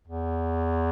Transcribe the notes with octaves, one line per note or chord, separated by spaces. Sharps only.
E2